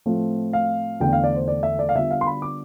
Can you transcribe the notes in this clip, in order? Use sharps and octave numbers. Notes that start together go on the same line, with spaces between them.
A2 F3 A3 C4 F4
F5
E2 D3 A3 G5
F5
D5
C5
D5
E5
D5
F5
D3 G3 B3 D4 F4 E5
F5
C6
B5
D6